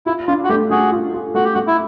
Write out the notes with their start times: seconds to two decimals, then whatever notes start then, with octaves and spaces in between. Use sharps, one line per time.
0.06 E4 F4
0.27 D4 F4
0.44 F#4
0.49 A3 G4
0.70 A3 F#4 G#4
0.92 F4
1.14 F4
1.35 A3 F#4
1.44 G4
1.54 A3 F#4
1.67 E4